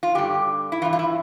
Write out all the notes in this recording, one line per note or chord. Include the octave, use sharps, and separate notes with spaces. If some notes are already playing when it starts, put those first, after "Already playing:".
F4
G2 D3 G4
E4
G2 E3 F4
F4
E4